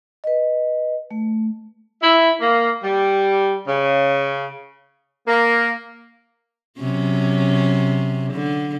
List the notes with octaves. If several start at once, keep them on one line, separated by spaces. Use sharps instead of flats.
B4 D#5
A3
E4
A#3
G3
C#3
A#3
C3 F#3 C#4
D3